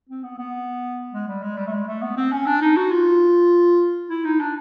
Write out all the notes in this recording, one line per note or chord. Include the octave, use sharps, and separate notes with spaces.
C4
B3
B3
G#3
G3
G#3
G3
A3
G#3
A3
B3
C4
C#4
D4
D#4
F#4
F4
E4
D#4
D4